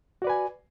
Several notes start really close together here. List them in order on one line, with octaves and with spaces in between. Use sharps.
F#4 D5 B4 G#5